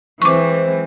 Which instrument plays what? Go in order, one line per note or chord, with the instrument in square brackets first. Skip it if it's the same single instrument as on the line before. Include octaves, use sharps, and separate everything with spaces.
[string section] E3 G#3 C4 [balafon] C#6 D6